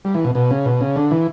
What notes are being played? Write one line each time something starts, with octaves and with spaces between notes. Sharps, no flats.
G3
E3
B2
B2
C#3
B2
C#3
D3
E3